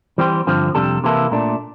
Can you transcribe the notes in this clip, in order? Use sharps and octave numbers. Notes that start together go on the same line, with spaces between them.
E3 G3 C4 G4 C5
G2 D3 F3 C4
F2 C3 G3 D4 A4
C3 E3 A#3 E4 A4
A#2 A3 D4